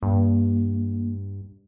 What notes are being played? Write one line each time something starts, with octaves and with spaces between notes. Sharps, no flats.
G2 A#3